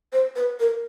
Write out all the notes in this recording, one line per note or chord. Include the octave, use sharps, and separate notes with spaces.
C5
B4
A#4